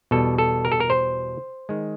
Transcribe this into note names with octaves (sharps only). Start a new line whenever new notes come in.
E2 B2 G3 A4
A4
A#4
A4
A#4
C5
D#3 G#3